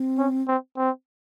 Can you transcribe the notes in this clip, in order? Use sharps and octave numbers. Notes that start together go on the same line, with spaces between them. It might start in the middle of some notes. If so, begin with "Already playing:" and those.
Already playing: C4
C#4
C4
C4